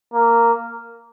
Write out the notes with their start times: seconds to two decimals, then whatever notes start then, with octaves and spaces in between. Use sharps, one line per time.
0.14 A#3